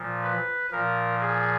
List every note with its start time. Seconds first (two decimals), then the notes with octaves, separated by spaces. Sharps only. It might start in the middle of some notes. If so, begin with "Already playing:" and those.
Already playing: A#2 F3
0.23 B4
0.71 A#2 F3 A#4
1.20 G#4